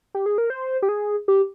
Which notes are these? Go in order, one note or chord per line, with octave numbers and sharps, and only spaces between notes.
G4
G#4
A#4
C5
G4
G#4
G4